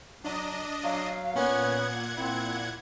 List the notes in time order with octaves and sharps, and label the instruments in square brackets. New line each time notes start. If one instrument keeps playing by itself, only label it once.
[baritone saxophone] F#3 [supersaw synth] D4 D#5
[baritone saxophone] F#3 [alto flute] F5
[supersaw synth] A#2 F#5 G#6 [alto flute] B3 [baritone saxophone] C#4
[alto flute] C4 [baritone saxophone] E4